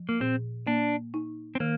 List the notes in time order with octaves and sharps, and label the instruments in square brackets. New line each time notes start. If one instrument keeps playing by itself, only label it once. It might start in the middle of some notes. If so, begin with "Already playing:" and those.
Already playing: [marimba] F3
[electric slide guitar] A#3
[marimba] A#2 [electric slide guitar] C4
[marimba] A#3 [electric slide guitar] D4
[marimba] D#4
[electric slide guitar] C4
[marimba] D#3 [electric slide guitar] A#3